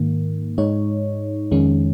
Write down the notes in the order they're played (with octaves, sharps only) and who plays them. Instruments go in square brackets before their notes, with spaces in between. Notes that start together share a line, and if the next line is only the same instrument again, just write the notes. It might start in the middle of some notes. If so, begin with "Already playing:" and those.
Already playing: [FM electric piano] G#2 D#3 A#3
G#2 G#3 D#4 C#5
F2 D#3 G#3 C#4